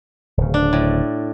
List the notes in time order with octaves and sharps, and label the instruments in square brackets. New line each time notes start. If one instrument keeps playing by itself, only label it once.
[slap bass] D1 C#3
[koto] D4
A2